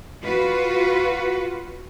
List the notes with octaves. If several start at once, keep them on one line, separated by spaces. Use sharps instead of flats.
F4 F#4 B4